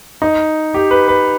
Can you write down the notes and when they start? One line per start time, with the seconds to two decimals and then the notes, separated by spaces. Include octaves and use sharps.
0.22 D#4
0.74 G4
0.91 B4
1.08 B4